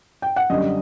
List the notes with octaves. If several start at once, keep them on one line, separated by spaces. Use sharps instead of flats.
G5
F#5
F#2 D3 G3 D#5